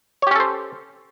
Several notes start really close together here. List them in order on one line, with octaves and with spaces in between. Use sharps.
C#5 G4 C#4 A4 C5